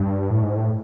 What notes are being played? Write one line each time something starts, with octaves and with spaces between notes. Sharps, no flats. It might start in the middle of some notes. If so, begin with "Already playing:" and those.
Already playing: G2
A2
G#2
A2